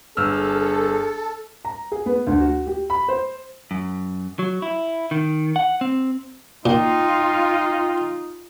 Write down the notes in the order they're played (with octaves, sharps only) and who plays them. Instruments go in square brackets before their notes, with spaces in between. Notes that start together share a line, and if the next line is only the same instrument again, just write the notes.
[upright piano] G1 E6 F6 [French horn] G#4 [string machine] A4
[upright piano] A#5
G#4
B3
D2
F#4
G4
B5
C5
[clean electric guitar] F#2
F#3
E4
D#3
F#5
C4
[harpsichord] A#2 [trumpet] D#4 [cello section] F4 [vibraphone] G5